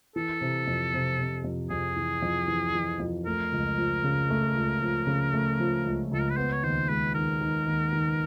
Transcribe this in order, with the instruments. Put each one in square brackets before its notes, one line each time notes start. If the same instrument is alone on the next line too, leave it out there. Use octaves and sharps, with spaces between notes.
[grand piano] E3 [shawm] A4
[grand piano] C3
F2
C3
C3
F2
[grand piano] F2 [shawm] G#4
[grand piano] E3
F2
E3
E3
F2
[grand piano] A3 [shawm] A#4
[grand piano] C#2
F3
C#3
A3
C#2
F3
C#3
A3
F3
C#2
[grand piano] C#2 [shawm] A4
[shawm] A#4
B4
[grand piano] B3 [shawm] C5
[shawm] C#5
[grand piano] D#2 [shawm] C5
[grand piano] G#3 [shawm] B4
[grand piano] D#3 [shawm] A#4
[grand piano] D#3
D#2
D#3